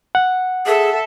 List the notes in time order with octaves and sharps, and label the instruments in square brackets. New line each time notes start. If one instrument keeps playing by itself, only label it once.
[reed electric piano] F#5
[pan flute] G#4 [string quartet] A4 E5